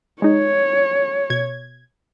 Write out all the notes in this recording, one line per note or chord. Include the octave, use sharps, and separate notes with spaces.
G#3 D#4 C#5
B2 G#6